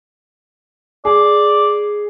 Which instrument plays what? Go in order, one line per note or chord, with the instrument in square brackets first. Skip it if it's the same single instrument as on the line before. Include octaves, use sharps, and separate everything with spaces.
[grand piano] G#4 [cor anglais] D5